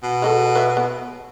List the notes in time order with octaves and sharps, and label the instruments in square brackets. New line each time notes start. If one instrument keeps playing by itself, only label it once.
[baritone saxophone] B2
[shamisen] G#3 F#4 A4
B4 C#5 E5
B3